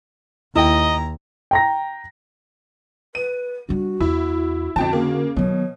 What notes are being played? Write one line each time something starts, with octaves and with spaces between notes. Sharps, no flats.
D#2 E4 D#5 G5 A#5
G5 A#5 A#6
B4 D#7
G3 D4 F#4
E2 E4
F2 D3 F#4 G5 A5
C#3 A#3
B2 D#3 F#3 C#5